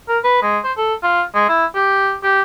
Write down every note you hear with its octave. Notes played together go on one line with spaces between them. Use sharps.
A#4
B4
G#3
C5
A4
F4
G#3
E4
G4
G4